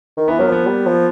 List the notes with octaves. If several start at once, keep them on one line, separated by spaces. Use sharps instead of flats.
D#3
E3 B3
F#3 A#3
F3 B3
G3
F3